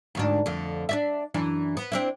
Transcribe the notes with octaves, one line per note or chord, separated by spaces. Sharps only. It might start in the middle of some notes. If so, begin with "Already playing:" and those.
D2 G#2 D4
F2 D3
D4 D5 E5
F#2 E3 D4
B3
C4 D4 E4